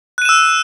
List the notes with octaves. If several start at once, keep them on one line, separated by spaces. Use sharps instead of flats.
E6 F#6 D#7 E7